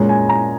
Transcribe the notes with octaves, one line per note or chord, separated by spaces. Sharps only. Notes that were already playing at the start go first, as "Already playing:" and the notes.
Already playing: A#2 G#3 C#4 A#5
G#5
A#5